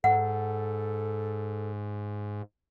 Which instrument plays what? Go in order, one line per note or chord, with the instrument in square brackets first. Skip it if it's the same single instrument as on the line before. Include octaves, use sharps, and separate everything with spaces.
[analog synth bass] G#2 [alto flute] A4 [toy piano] F#5